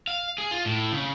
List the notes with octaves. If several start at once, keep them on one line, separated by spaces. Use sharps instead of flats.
F5
G#4
F4
A2
C#3